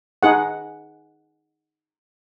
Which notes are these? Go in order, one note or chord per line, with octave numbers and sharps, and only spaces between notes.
D#4 G#4 F#5